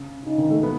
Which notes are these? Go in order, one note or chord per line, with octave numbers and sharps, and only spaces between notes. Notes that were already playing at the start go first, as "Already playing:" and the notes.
Already playing: C#3
C#3 D#4
D#3
A3
B3